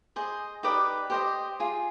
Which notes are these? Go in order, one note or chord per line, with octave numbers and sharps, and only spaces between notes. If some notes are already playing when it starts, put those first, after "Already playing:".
G#4 C5 D#5
D#4 G4 B4 D5 D#6
G4 C5 D#5
F4 G#4